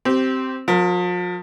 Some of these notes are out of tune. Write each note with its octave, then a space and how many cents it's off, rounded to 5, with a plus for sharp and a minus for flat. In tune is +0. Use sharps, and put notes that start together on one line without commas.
C4 +0 G4 -20
F3 +40 A#4 +0